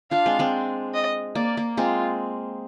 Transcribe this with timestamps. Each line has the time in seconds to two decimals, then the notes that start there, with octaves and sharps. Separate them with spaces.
0.11 D4 F4 F5
0.26 G#3 C4
0.39 G#3 C4
0.95 D#5
1.35 A#3 D5
1.57 A#3
1.77 G#3 C4 F4